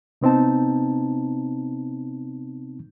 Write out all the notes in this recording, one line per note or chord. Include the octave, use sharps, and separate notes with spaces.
C3 B3 C4 D#4 A5